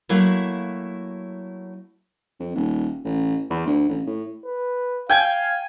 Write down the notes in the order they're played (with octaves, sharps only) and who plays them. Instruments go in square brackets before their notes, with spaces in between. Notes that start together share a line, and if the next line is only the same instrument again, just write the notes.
[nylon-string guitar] F#3 A3 A#3 E4 F5
[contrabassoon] F2
D#1
A1
E2
D2
A1
A2
[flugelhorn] B4
[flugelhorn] F5 [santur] G5 G#5